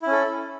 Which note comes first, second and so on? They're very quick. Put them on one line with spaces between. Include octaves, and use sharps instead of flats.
E4 C#4 A4